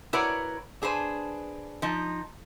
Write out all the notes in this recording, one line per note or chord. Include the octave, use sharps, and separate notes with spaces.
E4 F#4 A#4 B4 C#5 D5
D4 G#4 B4 C5
F3 D#4